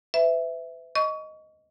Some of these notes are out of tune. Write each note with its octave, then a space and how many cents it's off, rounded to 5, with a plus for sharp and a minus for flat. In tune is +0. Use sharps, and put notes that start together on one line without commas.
B4 +40 E5 +0
D#5 +0 C#6 +30